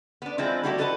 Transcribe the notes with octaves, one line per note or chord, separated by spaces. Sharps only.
B3 D4
F3 G#3 C4 D4 E4
G3 A#3 E4 F#4 G4 A4
F#4 A4 B4 D#5 G5 A5